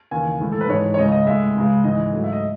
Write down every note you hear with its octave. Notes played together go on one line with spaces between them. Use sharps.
D#2 C#3 E3 G#5
A2 E3 G#3
A4
B4
G#2 E3 G#3 C#5
C#5
C#2 C#3 G#3 D#5
D#5
A2 G#3 E5
C#2 C#3 G#3
G#2 E3 G#3 D#5
G#2 F#3 A3
E5
D#5